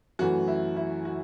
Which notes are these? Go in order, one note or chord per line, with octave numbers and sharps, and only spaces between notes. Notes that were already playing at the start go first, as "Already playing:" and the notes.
F#2 E3 A3 F#4
E4
E4
F#4